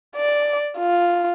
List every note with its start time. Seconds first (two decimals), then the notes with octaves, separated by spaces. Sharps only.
0.16 D5
0.78 F4